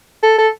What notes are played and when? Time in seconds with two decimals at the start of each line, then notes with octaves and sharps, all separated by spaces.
0.23 A4
0.38 A4